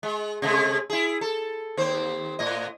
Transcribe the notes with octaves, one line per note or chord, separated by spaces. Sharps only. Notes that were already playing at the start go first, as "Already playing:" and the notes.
G#3
C3 G#3 A3
E4 G#4
A4
D#2 C4 C5
A2 D#5